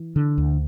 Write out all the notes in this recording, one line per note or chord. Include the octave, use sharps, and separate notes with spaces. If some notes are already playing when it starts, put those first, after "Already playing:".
Already playing: E3
D3
D2